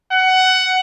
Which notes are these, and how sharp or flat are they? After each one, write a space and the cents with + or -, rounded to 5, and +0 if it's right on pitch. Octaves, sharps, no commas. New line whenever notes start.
F#5 +15